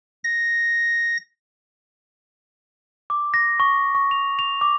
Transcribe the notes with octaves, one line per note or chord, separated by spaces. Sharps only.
A#6
D6
A#6
C#6
C#6
F7
F7
D6